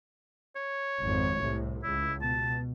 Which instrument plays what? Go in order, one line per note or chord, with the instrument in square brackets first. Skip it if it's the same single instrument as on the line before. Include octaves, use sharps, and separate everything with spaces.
[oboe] C#5
[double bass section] G#1 F2
C2 A2
[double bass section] C#2 [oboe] E4
[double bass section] B2 [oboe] A5